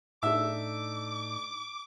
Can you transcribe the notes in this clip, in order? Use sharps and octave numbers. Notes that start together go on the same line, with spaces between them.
A2 D4 D#4 A4 E5 D6